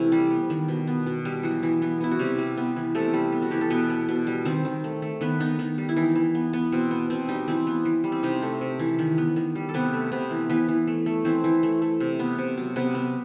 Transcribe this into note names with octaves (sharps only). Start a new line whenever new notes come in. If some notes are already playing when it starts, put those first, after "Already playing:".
Already playing: C3 E3 A3 E4
G3
B3
D#3
B2
B3
B2
G3
E3 F#3 F#4
E3
B3
B3 E4
F#4
C3 G3 G4
G3
B3
E3
C3 A3 A4
G3
B3
F#4
E3 G4
A4
B2 B3 B4
B3
B2
G3
D#3 C4 C5
D#3
A3
A3
D#3 B3 B4
B3 D#4
D#3 D#4
G3
E4
E3 D#4
E3
B3
B3
B2 C4
B3
B2 C4
G3 D#4
E3 C4
B3
E3
G3
C4
C3 D#4
A3
C3
E3
D#3
B3
D#3
G3
A4
C3 B3 B4
A3
C3 B3 B4
E3
E3 B3 B4
E3
A3
A3
E3 C4 C5
E3
A3
A3
C3
B3
C3
F#3
C3 B3 B4
B3